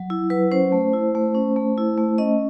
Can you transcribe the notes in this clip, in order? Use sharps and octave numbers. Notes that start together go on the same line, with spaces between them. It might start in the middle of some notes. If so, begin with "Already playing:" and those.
Already playing: F#3
E4
F#3 B4
C#4 C5
A3
E4
A3
C#4
A3
E4
A3
C#4 D#5